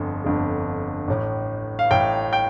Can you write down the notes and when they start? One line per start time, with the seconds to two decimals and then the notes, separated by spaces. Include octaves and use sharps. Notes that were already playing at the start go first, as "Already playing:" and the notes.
Already playing: G1 F2 D3
0.25 G1 F2 D3
1.08 A1 A2
1.79 F5
1.91 A1 A2 G5
2.33 G5